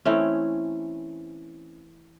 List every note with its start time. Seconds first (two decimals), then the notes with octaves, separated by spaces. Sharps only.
0.05 E3 A3 C4 C#4